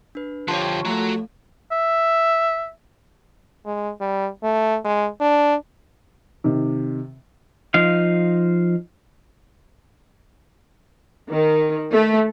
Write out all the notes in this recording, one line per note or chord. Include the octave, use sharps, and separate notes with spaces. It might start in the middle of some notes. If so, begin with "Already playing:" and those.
D4 B4
D3 F3 A#3 F4 G4 C#5 A5 C6
F3 A3 A#3 F#4 A#5
E5
G#3
G3
A3
G#3
D4
C3 D#3
F3 D#4 F5
D#3
A3